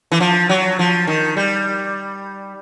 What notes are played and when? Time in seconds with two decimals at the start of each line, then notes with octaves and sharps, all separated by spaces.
0.12 E3
0.20 F3
0.49 F#3
0.79 F3
1.07 D#3
1.37 G3